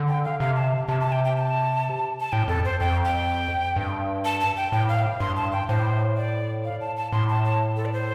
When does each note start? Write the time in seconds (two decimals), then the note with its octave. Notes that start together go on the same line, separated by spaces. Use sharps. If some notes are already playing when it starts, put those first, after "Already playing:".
Already playing: D3
0.08 G5
0.24 F5
0.40 C3 F5
0.56 A5
0.88 C3 A5
1.00 A5
1.12 G5
1.25 G5
1.36 A5
2.20 A5
2.32 A2 G5
2.48 F2 A4
2.65 C5
2.80 F2 G5
3.05 G5
3.76 G2
4.25 A5
4.41 A5
4.57 G5
4.72 A2 G5
4.89 F5
5.20 G2 C6
5.37 A5
5.52 G5
5.69 A2 C5
6.17 D5
6.65 F5
6.81 A5
6.97 A5
7.12 A2 C6
7.29 A5
7.45 A5
7.77 A4
7.85 D5
7.93 C5